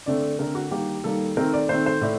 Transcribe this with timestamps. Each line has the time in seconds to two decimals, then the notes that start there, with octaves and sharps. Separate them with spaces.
0.06 D3 A3 C4 D5
0.39 D3 A3 C4 A#4
0.55 F#4
0.71 D#3 G3 A#3 G4
1.04 D#3 G3 A#3 A4
1.37 D#3 A3 C4 A#4
1.53 D5
1.69 D#3 A3 C4 C5
1.86 C5
2.01 A2 A3 D5